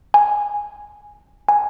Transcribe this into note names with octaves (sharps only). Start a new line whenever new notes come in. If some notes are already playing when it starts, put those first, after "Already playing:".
G#5
G#5